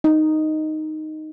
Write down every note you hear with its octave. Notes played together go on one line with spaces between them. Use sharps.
D#4